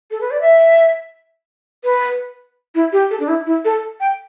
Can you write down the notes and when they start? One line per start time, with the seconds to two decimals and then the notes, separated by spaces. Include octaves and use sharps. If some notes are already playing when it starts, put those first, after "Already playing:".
0.11 A4
0.21 B4
0.31 D5
0.41 E5
1.84 B4
2.75 E4
2.93 G4
3.11 A4
3.20 D4
3.28 E4
3.46 E4
3.65 A4
4.00 G5